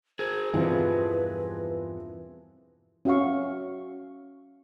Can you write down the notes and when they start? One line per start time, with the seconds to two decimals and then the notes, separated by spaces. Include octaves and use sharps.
0.19 G#4 A#4 C5
0.53 E2 G2 B2 E3 F3 C4 B4
3.05 C#4 F#4 E5 F5 C#6